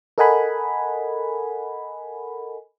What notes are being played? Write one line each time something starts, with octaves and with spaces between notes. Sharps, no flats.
A4 A#4 D#5 F#5 G#5 B5